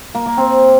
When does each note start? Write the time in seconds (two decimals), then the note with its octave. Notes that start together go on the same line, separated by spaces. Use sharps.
0.15 A#3
0.26 A#3
0.37 C4